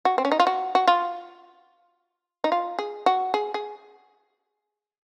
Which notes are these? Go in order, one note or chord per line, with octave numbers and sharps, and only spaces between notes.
F#4
C4
C#4
D#4
F4
F#4
F#4
F4
D#4
F4
G#4
F#4
G#4
G#4